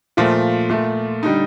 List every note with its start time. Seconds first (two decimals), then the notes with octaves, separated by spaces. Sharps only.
0.17 A#2 F3 A3 F4
0.70 A#2 A3
1.23 D3 G3 D#4